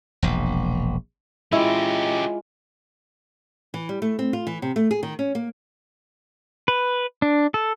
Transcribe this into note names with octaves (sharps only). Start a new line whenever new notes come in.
E1 A#1
G#3 C#4 E4 F4 G4
E3
G3
A3
C4
F4
E3
C3
A3
G#4
D#3
C#4
A#3
B4
D4
A4